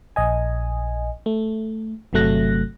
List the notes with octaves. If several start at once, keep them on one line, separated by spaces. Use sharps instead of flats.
A#1 D#5 G#5
A3
G1 C3 F#3 A3 F#6 A#6